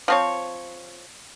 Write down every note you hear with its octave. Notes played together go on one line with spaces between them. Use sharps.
F3 C4 C#5